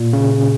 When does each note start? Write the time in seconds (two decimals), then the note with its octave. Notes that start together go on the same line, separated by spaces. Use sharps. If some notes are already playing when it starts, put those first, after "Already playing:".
Already playing: A#2
0.13 C#3